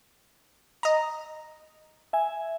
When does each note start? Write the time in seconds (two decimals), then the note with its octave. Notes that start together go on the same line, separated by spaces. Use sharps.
0.83 D#5 A#5
2.13 E5 G#5